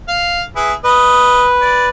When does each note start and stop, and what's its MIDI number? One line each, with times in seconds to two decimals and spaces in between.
0.08 0.41 77
0.56 0.73 64
0.56 0.73 68
0.56 0.73 71
0.84 1.89 71
0.84 1.45 75
1.61 1.87 74